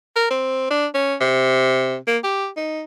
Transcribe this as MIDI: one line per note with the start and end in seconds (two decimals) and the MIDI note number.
0.16 0.29 70
0.31 0.69 60
0.70 0.86 62
0.95 1.15 61
1.20 1.96 48
2.07 2.18 58
2.24 2.48 67
2.57 2.84 63